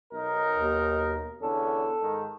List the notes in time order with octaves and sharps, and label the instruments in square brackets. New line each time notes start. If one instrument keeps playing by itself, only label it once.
[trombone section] B1 D#4 A#4
[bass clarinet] D#2
[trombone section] E2 D3 C#4 [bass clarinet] A4
[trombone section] G#2 D#3